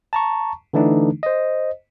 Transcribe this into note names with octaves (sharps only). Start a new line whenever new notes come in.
A5 A#5 C#6
D3 E3 A3 D4 D#4
C5 D#5